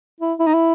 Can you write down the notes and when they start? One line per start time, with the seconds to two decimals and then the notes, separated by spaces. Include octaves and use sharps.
0.20 E4
0.39 E4
0.47 D#4
0.54 E4